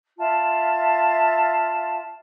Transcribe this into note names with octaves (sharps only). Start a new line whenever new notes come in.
F4 E5 F5 A5